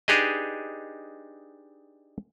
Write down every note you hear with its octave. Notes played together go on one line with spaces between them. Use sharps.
D4 D#4 G4 G#4 B4 D#5